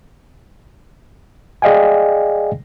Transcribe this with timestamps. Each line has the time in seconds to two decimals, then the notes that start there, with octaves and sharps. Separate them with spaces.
1.62 G#4 D5 D#5 F5 G5 G#5